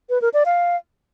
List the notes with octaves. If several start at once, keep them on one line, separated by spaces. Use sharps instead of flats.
B4
A#4
D5
F5